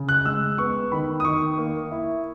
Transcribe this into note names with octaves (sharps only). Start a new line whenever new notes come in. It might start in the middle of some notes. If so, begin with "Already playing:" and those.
Already playing: C#3
F#6
G#3 E6
B3 C#6
D#3 B5
D#6
D#3 C#6
A#3
E4